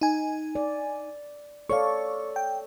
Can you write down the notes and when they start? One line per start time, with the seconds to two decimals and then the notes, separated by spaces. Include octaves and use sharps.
0.01 D#4 G#5
0.55 D5
1.70 A4 C#5 D5 F5 C#6
2.36 G5